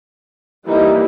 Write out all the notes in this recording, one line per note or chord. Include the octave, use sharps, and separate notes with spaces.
E3 G3 A#3 D#4